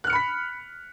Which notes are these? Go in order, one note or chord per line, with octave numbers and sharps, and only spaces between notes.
B5 F6 F#6 B6 C#7